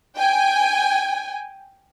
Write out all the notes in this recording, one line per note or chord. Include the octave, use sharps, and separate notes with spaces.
G5 G#5